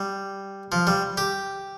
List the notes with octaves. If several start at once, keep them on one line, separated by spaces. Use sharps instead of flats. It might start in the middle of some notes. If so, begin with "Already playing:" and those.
Already playing: G3
F3
G3
G4